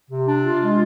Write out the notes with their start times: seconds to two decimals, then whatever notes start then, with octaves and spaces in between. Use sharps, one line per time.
0.10 C3
0.27 D4
0.44 F4
0.61 G#3